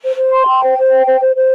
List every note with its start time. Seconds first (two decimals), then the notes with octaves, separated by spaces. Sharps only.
0.03 C5
0.17 C5
0.32 C6
0.46 G5
0.61 C5
0.76 C5
0.90 G5
1.06 C5
1.19 C5
1.35 C5